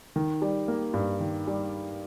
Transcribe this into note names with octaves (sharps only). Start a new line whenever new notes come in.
D#3
G3
A#3
G2
D#3
G3